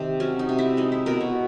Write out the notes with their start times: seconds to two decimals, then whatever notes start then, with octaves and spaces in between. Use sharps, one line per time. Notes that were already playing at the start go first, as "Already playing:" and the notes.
Already playing: C3 D#3 C4
0.20 F#3 C#4
0.39 D#4
0.49 C3
0.58 E4
0.77 G#3 D#4
0.92 E4
1.06 B2 A#4
1.21 C#5